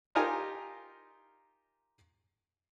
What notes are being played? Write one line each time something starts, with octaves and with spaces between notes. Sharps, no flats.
D#4 F4 G4 A#4 G#5 A#5